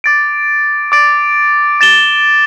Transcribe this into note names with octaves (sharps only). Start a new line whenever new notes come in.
D6 A6 D7
D6 A6 D7
A6 E7 G7